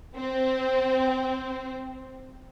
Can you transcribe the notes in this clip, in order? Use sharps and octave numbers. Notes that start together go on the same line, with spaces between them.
C4